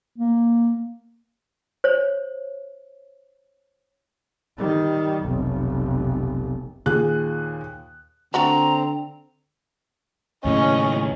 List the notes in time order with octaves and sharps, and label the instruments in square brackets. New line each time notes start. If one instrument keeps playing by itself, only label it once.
[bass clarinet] A#3
[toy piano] C5 C#5
[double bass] D#3 G3
F1 B1
[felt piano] D#2 A#2 G#4 F#6
[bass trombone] D3 [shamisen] A3 F#4 B5 [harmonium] C4 [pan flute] A#5
[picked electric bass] D#2 A2 C#3 [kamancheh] C#4 D#5